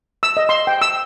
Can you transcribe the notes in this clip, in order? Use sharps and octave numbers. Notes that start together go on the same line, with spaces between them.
E6
D#5
C6
G5
E6